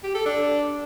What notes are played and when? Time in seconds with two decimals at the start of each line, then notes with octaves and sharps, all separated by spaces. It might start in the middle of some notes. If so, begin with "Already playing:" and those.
0.04 G4
0.15 A4
0.26 D4